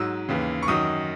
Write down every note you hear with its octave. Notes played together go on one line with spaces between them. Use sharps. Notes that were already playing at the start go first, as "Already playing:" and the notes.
Already playing: G#2 F#3 E6
D#2 C#3 E3
C#6
F#2 D#3 F#3 D#6